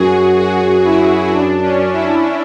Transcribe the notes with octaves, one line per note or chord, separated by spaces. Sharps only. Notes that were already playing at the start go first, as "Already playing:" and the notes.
Already playing: F#2 F#4 G#4
F#4
E4
D4
C#4
E4